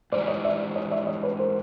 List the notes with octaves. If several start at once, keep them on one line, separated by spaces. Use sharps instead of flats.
G#2 E3 G3 C5 D5
C#5 D#5
D5 E5
C#5 D#5
D5 E5
C#5 D#5
B4 C#5
A#4 C5